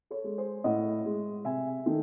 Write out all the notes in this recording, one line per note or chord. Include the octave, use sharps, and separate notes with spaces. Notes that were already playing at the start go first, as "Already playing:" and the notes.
A4 C#5
G#3
G#4 C5
A2 D#5 F#5
G#3
C3 E5 G#5
D#3 A3